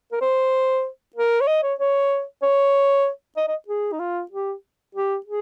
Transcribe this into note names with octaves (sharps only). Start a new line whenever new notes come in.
A#4
C5
A#4
C#5
D#5
C#5
C#5
C#5
D#5
D#5
G#4
D#4
F4
G4
G4
G#4